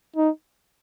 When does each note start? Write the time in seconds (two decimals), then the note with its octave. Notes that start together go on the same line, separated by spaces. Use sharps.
0.16 D#4